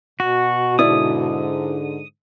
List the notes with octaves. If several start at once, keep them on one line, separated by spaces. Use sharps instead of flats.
B2 F#4
G#2 D3 E4 D5 D#6